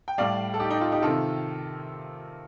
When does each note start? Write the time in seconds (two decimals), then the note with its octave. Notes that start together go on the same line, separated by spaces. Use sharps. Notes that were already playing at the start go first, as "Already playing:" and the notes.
0.08 G5
0.18 A2 G3 D5 F5
0.54 A4
0.59 D#4 G4
0.71 D#4
0.81 F4
0.92 D#4 G4
1.02 C3 D#3 F4 A4